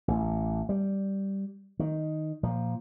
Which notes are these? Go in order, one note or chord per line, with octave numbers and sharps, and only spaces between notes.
A1
G3
D#3
A#2 F3